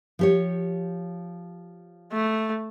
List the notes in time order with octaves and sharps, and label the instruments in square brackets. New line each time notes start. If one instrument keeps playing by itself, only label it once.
[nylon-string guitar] F3 G4 C#5
[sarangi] A3